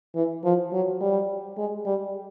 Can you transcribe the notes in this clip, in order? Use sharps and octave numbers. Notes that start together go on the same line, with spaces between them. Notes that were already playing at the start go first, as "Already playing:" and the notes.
E3
F3
F#3
G3
G#3
G3